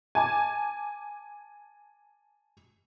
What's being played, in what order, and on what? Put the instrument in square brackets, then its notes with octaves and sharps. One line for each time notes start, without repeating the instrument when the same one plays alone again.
[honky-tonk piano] G#5 A5 D6